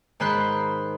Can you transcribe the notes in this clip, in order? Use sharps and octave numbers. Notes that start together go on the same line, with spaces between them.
G#2 D#3 C5 B5 C6 F#6